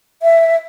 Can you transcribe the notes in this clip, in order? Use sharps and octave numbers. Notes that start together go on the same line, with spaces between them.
E5